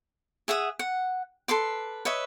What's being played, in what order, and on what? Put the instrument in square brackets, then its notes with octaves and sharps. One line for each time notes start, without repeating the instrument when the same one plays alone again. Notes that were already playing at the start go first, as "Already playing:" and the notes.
[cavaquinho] G#4 E5 F#5 D#6
F#5
A4 B4 C6 D6
B4 C#5 D#5 E5